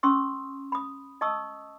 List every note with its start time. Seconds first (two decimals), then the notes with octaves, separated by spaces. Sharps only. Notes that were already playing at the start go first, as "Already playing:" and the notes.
0.03 C#4 C6 C#6 D#6 E6
0.72 B5 D#6
1.21 D#5 A5 C#6 D#6 E6